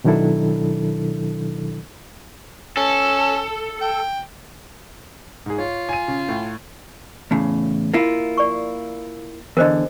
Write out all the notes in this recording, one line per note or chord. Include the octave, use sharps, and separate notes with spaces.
B2 D#3 F#3 D4 E4 A4
C#4 A4
G5
G#2 G#4
F4 C#5
G#5 D#7
C#3
A2
E2 A2 C#3
A#3 E4 F4
D5 C#6
E2 D3 A#4 C5 D#5